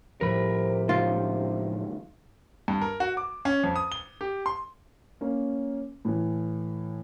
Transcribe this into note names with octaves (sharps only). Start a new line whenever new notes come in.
A2 C3 F3 G3 A#4 B5
C#2 F#2 D#3 F4
G2
A#4
F#4
D6
C#4
F2
D#6
G7
G4
C6
A#3 C#4
A2 E3